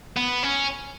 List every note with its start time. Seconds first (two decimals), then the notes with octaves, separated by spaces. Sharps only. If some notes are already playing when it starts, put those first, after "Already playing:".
0.17 B3
0.43 C#4